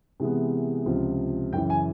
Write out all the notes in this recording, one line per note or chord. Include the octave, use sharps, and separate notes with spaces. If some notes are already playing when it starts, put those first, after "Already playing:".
C3 E3 G#3 B3
C#2 C3 F3
F#2 C#3 E3 G5
G#5